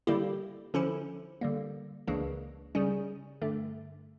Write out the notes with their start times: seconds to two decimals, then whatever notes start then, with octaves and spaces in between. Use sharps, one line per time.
0.07 D3 G3 A#3 E4 G4
0.74 D3 F3 C#4 E4
1.41 D3 G3 A#3
2.07 C#2 C#3 E3 A#3 D4
2.75 C#3 G3 C#4
3.42 G2 D3 A3